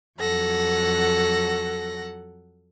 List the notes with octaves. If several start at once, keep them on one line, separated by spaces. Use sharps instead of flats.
F2 F#3 A4 F#5 A#6